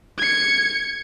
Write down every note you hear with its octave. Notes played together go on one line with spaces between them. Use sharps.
G#6 C#7